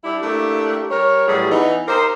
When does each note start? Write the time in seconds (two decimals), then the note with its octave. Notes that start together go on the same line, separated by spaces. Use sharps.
0.04 G3 D4 E4
0.23 A3 A#3 D4 E4 G4
0.90 G3 A#4 C#5
1.28 A2 E3 F#3 G3 G#4
1.51 E3 B3 D#4
1.88 D#4 G4 A#4 C5